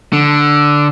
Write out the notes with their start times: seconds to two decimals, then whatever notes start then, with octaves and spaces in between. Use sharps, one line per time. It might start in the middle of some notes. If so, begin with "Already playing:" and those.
0.13 D3